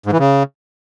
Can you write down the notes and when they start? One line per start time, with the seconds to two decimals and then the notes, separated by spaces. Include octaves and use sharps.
0.06 G#2
0.13 E3
0.19 C#3